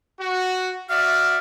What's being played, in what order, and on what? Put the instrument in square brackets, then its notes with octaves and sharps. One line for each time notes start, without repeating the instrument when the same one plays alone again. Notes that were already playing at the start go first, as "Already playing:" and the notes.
[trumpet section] F#4
[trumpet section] F#4 D5 E5 [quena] F6